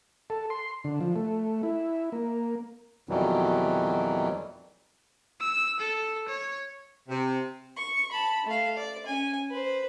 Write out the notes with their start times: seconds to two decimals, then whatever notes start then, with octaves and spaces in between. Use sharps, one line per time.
0.30 A4
0.50 C6
0.84 D3
1.01 F3
1.16 A3
1.63 E4
2.12 A#3
3.09 F2 B2 D#3 E3 F#3 G3
5.40 E6
5.80 A4
6.28 C#5
7.08 C3
7.77 C#6
8.11 A5 B5
8.46 A3 F5
8.77 D5
9.06 C#4 G#5
9.50 B4 C5